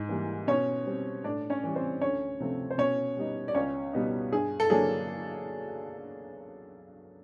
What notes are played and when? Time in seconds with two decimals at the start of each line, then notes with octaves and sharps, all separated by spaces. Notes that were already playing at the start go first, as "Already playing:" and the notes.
Already playing: G#2
0.09 E3 G3 A#3
0.47 B2 C#4 C#5
0.86 G3 C4
1.24 A2 D4 D5
1.50 C#4 C#5
1.64 E3 G3
1.75 C4 C5
2.01 D2 C#4 C#5
2.40 C3 F3 A3 C4
2.70 C5
2.78 B2 C#4 C#5
3.17 G3 B3 D#4
3.48 D5
3.55 C#2 C#4 C#5
3.93 B2 G3 B3 D#4
4.32 G2 G#4
4.60 A4
4.70 D3 F#3 A#3 D4 G#4